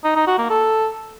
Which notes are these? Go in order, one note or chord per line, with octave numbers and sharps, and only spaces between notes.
D#4
D#4
F#4
A#3
A4